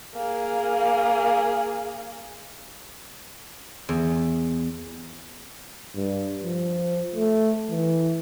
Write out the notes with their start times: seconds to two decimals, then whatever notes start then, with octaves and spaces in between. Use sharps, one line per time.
0.15 A#3 G#4
3.89 E2
5.96 G2
6.44 F3
7.16 A3
7.71 E3